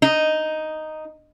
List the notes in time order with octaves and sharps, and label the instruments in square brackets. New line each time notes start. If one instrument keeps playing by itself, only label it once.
[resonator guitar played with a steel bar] D#4